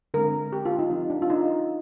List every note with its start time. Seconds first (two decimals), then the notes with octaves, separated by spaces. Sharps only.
0.14 D3 G#3 C4 A#4
0.53 G4
0.65 F4
0.79 D#4
0.90 F3 C4 D#4
1.10 D4
1.22 F4
1.30 D#4